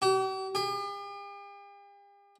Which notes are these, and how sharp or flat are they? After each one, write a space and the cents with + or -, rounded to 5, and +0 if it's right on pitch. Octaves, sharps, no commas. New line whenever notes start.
G4 -45
G4 +45